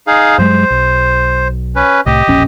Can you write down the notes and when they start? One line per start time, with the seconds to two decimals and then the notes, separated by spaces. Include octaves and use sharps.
0.07 D#4 G#4 F5
0.38 G2 F#3 G#3 C5
0.70 B1
1.76 C#4 B4
2.06 C2 A2 G4 D#5
2.27 E1 A#1 C#4